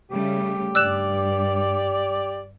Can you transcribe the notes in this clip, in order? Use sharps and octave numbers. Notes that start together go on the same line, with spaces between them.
C#3 G3 A3 G4
G2 D5 E6 F#6 E7